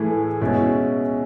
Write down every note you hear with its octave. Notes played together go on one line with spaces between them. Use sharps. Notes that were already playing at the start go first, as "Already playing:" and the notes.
Already playing: A2 E3 A3 E4 G#4
B2 G#3 C#4 E4